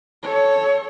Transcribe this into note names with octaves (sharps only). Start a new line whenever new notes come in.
A4 C#5